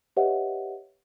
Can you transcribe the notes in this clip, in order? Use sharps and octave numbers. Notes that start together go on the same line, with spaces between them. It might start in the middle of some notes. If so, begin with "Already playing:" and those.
G4 B4 C#5 D#5 E5 F#5